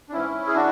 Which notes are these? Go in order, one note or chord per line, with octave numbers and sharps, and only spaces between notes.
D4
G#2 E3 C#4 E4
G#4
E3 D4 F#4